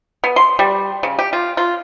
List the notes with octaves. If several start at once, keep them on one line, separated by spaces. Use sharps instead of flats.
B3
C6
G3
C#3
G4
F4
F4